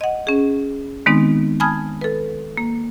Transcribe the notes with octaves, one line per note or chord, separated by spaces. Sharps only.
D#5 F#5
C#4 G#4
D#3 G#3 B3 C4 D#4
G#5 A5 B5 D#6 F6 G#6
A4 B4
A#3